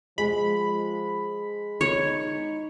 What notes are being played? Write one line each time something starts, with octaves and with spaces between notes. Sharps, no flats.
F3 G#3 B5
D#4 C#5